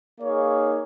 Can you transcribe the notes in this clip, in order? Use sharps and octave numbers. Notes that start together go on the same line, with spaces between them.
A#3 D#4 G#4 C#5 F5